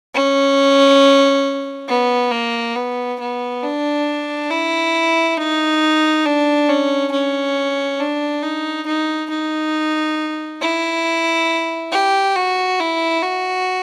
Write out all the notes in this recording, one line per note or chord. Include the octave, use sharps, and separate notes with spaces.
C#4
B3
A#3
B3
B3
D4
E4
D#4
D4
C#4
C#4
D4
D#4
D#4
D#4
E4
G4
F#4
E4
F#4